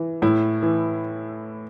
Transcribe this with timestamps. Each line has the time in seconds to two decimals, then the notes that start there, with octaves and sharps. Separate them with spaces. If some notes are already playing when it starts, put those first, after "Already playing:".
Already playing: E3
0.22 A2 E4
0.62 E3